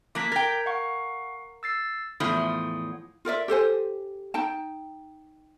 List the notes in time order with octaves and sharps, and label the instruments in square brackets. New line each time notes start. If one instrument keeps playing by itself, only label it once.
[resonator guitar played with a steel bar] F3 A#3 [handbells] D6 F#6 B6
[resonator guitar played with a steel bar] A#4 G5 [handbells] G#6
[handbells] F5 F#5 C#6
E6 A6 C7
[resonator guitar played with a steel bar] E2 A2 F3 [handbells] D#6
[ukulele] F4 A#4 D5 E5
G4 A4 C5 G#5
D#4 G5 A5